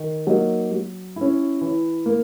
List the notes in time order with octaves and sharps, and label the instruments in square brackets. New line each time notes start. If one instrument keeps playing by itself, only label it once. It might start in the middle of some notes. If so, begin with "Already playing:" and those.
Already playing: [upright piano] D#3
F#3 A#3 D#4
F#3
C#4 E4
E3
A#3